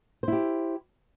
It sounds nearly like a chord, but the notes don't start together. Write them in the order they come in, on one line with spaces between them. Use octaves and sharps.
C5 E4 G4